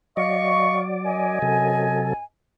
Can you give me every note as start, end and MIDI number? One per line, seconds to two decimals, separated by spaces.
0.17 1.39 54
0.17 1.39 74
0.17 0.80 75
0.17 0.80 77
0.17 0.80 85
1.06 2.22 42
1.06 2.22 75
1.06 2.22 80
1.42 2.13 48
1.42 2.13 54
1.42 2.13 69